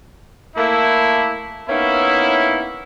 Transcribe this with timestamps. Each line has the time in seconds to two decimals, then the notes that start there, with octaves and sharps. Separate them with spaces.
0.56 A3 A#3 E4
1.69 A#3 B3 C#4 D#4 E4